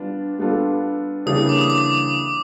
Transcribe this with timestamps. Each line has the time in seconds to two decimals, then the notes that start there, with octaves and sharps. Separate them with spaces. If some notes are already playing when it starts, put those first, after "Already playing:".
Already playing: G3 B3 D4 F4
0.39 G3 B3 D4 F4 A4
1.26 C#3 E3 G3 A#3 D4 D#6
1.49 D6
1.61 D#6
1.70 D6